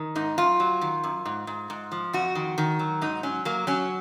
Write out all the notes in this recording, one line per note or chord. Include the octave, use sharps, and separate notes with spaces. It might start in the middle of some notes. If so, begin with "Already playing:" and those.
Already playing: D#3
G#2 D#4
F#2 F4
F#3
D#3
F#2
G#2
G#2
G#2
F3
F2 F#4
D#3
D#3
F#3
G#2 D#4
F#3 C#4
F#3 A#3
F#3 C#4